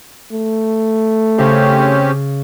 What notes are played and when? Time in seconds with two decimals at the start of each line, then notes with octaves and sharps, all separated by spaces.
0.32 A3
1.38 C#3 C4 C#4 G4